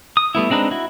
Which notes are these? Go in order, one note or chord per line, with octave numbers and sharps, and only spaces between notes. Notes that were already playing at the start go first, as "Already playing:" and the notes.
D#6
G3 A3 B3 E4
G#3 C4 D4 D#4 B4
E4 F#4